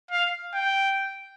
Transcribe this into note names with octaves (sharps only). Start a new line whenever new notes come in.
F5
G5